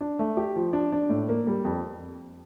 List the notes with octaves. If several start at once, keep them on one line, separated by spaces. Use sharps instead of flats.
D4
A3
G4
F3
D4
D4
A2
A#3
G3
F2